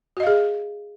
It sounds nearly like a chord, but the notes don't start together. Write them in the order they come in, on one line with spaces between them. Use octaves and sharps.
F#4 D#5 F5 G#4